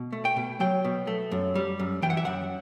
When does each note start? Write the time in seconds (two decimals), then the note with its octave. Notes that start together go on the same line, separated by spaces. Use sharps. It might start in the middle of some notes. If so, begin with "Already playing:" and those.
Already playing: B2
0.12 A3
0.25 G5
0.36 B2
0.60 F#3 G5
0.85 B2
1.07 A3
1.32 F#2
1.55 G3
1.79 F#2
2.02 E3 G5
2.10 F#5
2.17 E5
2.25 F#2 F#5